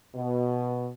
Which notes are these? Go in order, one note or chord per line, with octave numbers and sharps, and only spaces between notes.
B2